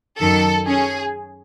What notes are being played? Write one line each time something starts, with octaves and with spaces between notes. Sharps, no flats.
F#2 D#3 F#3 A4
C#4 G#4